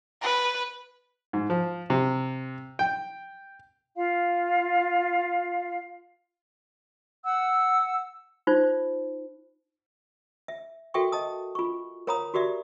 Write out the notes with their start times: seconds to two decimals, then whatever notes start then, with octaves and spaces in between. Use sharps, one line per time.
0.22 B4
1.33 G#2
1.50 F3
1.90 C3
2.79 G5
3.96 F4 F5
7.24 F#5 E6
8.47 D#4 F4 C5
10.48 E5
10.94 F#4 A4 A#4 E5 G5 C#6
11.12 D#5 A5 D#6
11.55 F4 C#6
12.07 A#4 C#5 F5 A#5 B5 D#6
12.34 F#4 G4 A#4 D5 E5